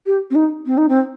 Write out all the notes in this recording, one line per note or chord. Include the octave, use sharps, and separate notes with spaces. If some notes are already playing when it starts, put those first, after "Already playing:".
G4
C4
D#4
C4
D#4
C4